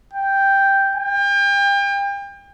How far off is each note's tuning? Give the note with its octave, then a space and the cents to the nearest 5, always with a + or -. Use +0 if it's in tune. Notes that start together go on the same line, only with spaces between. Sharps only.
G5 +0
G5 +35